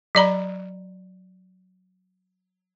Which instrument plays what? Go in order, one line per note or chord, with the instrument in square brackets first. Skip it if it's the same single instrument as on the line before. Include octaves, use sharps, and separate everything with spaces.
[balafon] F#3 D5 A#5 B5